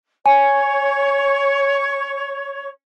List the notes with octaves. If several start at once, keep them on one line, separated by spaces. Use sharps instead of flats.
C#5 G#5 C#6